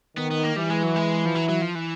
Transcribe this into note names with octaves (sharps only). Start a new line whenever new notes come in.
D#3 B3
B3
A#3
E3 G3
G#3
F#3
G#3
F3
F#3
F#3
F3
E3